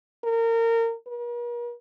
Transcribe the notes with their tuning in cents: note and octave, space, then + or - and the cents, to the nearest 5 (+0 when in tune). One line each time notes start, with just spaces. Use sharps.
A#4 -25
A#4 +45